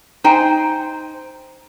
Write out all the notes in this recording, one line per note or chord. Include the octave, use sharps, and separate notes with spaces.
D#4 C5 G5 G#5